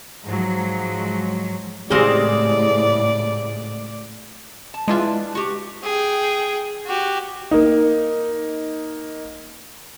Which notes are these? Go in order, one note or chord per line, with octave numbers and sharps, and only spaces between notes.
G#2 F3 F#3
A2 C#3 G#3 C4 G4 G#4 D5
A5
G#3 D4 E4 F4 B4 E5
F#4 G4
G#4 G5
F#4 G4
A#3 D#4